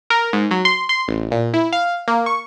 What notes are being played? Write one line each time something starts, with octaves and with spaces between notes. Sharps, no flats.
A#4
G#2
F#3
C6
C6
A1
A#2
E4
F5
A#3
C#6